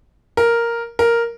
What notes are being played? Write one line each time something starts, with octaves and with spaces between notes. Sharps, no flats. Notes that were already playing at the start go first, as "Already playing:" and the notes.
A#4
A#4